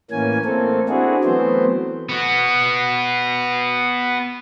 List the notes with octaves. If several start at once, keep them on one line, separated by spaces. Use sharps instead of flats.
A2 E3 A#3 C#4 G#5
A3 A#3 C4 A4
C4 D4 E4 F#4 G#4
E3 F#3 A3 B3 C4 C5
B3 F#4